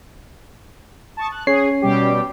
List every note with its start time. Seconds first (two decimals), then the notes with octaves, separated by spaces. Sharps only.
1.17 A5 C#6 D#6
1.32 F#6
1.47 C#4 G#4 C#5 C7
1.82 B2 G3 G4